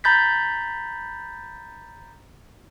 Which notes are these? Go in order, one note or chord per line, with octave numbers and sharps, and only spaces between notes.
A#5 B5 G6 A6 B6